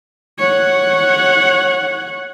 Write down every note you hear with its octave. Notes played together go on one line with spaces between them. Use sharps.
C#5 F#5